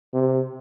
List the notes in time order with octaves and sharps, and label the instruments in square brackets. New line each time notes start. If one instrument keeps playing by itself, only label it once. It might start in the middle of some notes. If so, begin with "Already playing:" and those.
[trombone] C3